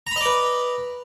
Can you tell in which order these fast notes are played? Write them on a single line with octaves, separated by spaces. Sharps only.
A#5 B5 D#5 D5 B4